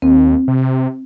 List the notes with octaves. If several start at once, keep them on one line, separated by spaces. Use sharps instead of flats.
D#2 C4
C3